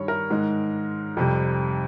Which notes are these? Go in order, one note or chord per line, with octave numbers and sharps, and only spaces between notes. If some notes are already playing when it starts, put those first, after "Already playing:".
Already playing: G2 D#3 G3 C#5
A#4
G#2 D#3 G#3
F2 C3 G3